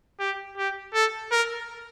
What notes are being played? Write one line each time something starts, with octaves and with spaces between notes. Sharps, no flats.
G4
G4
A4
A#4